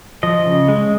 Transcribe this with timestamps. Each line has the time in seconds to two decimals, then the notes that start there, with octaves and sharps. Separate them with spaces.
0.23 F3 D#5
0.46 C#3
0.68 G#3